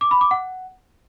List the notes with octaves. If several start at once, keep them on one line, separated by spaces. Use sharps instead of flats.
D6
B5
D6
F#5